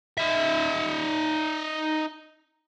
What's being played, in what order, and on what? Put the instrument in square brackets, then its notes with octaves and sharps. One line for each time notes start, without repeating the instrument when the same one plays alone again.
[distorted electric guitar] D#4 E5